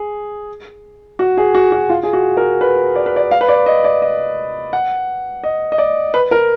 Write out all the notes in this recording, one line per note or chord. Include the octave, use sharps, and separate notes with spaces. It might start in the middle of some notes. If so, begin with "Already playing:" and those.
Already playing: G#4
F#4
G#4
F#4
F#4
F4
G#4
F#4
A#4
B4
D5
B4
D5
F5
B4
D5
D#5
D5
D#5
F#5
D#5
D#5
D5
B4
A#4